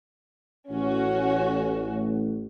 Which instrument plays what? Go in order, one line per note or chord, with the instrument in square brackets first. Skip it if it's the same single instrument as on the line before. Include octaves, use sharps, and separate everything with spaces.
[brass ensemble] A1 [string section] C#4 F#4